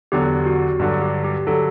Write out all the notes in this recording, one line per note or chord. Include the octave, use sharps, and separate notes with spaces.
E2 D3 F#3 G4
F#4
G2 D3 F#3
G4
G4
D3 F#3 A4